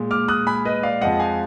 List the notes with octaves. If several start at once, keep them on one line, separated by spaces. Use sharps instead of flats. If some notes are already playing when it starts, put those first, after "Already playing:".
Already playing: A#2 G#3
D6 F6
D#6 F#6
G#5 B5
B4 D#5
D5 F5
F2 F3 G#3 D#5 F#5
F5 G#5